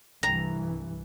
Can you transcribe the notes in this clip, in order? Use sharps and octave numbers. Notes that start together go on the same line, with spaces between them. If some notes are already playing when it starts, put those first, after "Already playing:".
C2 G2 E3 A#5